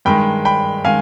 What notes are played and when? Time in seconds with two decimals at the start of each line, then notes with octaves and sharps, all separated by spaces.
0.05 G2 D#3 G#3 G5 B5
0.45 G5 B5
0.85 D#3 G#3 F5 G#5